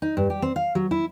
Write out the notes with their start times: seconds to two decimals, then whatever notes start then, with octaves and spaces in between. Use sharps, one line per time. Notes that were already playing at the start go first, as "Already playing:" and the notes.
0.02 D#4
0.17 G2
0.30 G4
0.42 C4
0.56 F5
0.75 F#3
0.91 E4